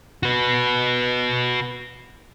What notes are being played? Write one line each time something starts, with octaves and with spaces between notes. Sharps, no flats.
F#4 B4